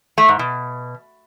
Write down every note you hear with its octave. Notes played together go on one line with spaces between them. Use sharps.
A3
G#2
B2